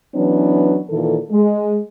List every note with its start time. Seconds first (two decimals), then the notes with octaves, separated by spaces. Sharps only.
0.15 E3 F#3 B3 C#4 D4
0.90 A#2 D#3 E3 A4
1.31 G#3